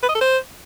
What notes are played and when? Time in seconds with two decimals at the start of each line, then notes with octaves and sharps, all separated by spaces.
0.03 B4
0.09 D#5
0.15 A4
0.21 C5